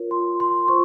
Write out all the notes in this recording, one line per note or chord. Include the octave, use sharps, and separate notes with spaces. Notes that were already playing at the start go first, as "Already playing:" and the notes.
Already playing: F4 A#4 C#5
C6
C6
F4 C5 C#6